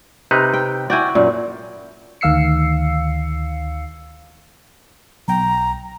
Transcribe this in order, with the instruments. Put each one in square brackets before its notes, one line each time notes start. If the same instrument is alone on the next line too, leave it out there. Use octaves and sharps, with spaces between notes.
[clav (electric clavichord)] C3 D#4 B4
[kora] G5
[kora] E4 F#4 [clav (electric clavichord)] D5 G5 G#5
[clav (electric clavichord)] F#2 [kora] A#2
[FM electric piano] D2 D#3 F5 E6 C7 C#7
[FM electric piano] B1 G5 [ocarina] A#5